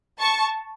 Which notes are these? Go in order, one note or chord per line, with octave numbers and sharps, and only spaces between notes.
A5 C#6